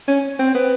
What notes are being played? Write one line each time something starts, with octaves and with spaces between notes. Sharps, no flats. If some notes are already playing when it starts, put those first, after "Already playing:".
C#4
C4
B3